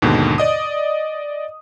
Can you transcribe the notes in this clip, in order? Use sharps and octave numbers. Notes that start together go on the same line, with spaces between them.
D#2 G#2 B2 D3
D5 D#5 D#6